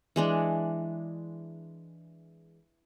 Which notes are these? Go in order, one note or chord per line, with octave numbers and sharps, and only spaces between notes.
E3 G#3 D4